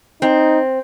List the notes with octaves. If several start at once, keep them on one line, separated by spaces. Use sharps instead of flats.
C4 D#4